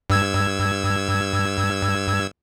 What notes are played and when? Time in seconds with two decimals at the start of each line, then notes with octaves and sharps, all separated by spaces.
0.10 G2 E6 G#6